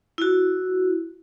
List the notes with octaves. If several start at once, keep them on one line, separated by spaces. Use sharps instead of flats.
E4 F#4